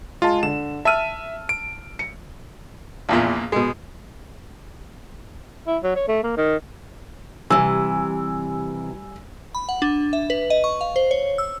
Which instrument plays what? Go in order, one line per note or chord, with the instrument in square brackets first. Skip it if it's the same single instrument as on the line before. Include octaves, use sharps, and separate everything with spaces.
[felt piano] G#3 A5 [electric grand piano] F4
[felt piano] D3 [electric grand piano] E7
[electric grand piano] E5 D#7 [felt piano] A5 E6 F6
[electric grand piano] D7
[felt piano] C#7
[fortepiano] A#1 E2 A#2
B2 G#3
[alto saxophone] E4
F#3
C#5
A3
A#3
D#3
[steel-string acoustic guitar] C3 E3 [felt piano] G3 G#5 E6
[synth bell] B5
F#5
D4
E5
B4
D#5
C#6
F5
C5
C#5
E6